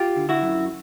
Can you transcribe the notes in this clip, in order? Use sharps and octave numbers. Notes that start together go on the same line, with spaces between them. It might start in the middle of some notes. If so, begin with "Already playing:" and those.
Already playing: F4 G4
D3
E4 F#4
F#2